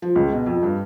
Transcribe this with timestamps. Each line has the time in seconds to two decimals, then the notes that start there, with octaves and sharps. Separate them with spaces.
0.02 F3
0.16 C#2
0.32 B2
0.46 F2
0.63 G2